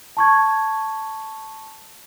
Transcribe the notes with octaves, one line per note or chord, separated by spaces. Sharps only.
A5 C#6 G#6